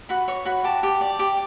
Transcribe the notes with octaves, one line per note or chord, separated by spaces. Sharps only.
F#4 B5
C#5 C#6
F#4 B5
G4 A5
G4
D5
G4